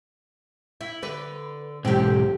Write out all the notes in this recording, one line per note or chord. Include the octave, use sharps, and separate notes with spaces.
E4
D3 B4
B1 G#2 C4 G4